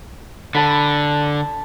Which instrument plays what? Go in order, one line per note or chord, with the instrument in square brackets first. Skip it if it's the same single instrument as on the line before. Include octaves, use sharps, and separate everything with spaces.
[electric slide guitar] D3 [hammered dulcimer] A5 B5